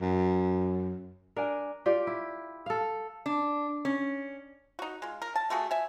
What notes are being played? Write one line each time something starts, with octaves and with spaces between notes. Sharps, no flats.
F#2
D4 A#4 G#5
F4 G4 D5
E4
A4 F5
D4
C#4
D#4 F#4
G#3 F4
A#4
A5
A3 F4 F#4 G#4
E5 G#5